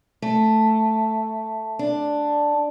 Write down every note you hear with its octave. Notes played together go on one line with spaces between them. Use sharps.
A3
D4